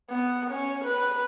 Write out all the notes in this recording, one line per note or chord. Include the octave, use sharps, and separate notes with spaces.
B3
C#4
B4